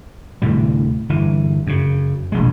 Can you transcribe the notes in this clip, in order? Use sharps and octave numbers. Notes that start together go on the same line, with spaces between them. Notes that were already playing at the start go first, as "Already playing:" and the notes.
D2 A2 C3 G3
G1 E3
F#2 C#3
E1 A#1 G#3